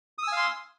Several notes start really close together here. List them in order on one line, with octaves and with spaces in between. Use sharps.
D#6 E6 G#5 F5 C6